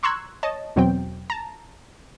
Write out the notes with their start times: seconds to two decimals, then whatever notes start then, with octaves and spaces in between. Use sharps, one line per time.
0.03 A#5 C6 C#6 E6 F#6 G#6
0.43 C#5 D#5 A5
0.76 E2 B2 F#3 C4 G5
1.30 A5 A#5